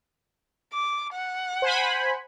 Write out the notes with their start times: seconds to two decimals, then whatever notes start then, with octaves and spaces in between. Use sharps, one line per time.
0.72 D6
1.13 F#5
1.62 C5 G#5 B5